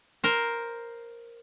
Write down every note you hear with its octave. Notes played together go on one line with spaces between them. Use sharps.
A#4 C5